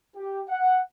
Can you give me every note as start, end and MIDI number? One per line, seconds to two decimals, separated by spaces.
0.16 0.42 67
0.49 0.80 78